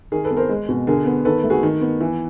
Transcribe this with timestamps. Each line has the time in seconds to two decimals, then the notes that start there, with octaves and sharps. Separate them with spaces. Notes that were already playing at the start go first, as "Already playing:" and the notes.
0.12 D#3 G#4 A#4
0.24 A4 B4
0.31 B3
0.37 A#4 C5
0.49 G#3
0.69 B2
0.87 D3 G#4 A#4
1.06 B3
1.25 D#3 A4 B4
1.44 A3
1.50 F#4 G#4
1.63 D#3
1.81 B3
2.01 E3